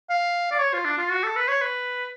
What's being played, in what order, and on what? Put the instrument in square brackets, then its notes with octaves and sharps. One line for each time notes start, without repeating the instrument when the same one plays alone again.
[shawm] F5
D5
C#5
F4
D4
F4
F#4
A4
B4
C#5
B4